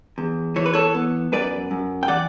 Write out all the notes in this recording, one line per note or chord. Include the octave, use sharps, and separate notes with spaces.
E2
E3 C#5
B4
A4 C#5
B3
F#2 B4 D5
F#2
G5
E3 D5 F#5